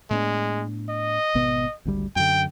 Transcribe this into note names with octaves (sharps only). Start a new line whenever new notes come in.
A2 G#3 B3 D4
D#5
G#1 B2 B3
G#1 D2 G3
F#2 D3 G5